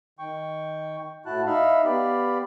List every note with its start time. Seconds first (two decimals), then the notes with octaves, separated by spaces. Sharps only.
0.19 D#3 G5 C#6
1.26 A2 E4 F#4 A5 F#6
1.46 D#4 E5 F5 B5
1.85 B3 G4 D5 F5 B5